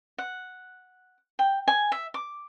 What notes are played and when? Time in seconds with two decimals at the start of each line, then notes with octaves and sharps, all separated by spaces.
0.18 F#5
1.39 G5
1.68 G#5
1.92 E5
2.14 D6